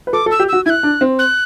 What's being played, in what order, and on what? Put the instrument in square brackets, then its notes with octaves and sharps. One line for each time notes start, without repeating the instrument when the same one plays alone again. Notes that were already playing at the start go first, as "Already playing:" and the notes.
[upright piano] B4
[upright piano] A4 [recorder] D6
[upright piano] A4
[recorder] E6
[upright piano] G4
[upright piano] F#4 [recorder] E6
[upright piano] E4 [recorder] G#6
[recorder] F#6
[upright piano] D4
C4
[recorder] F#6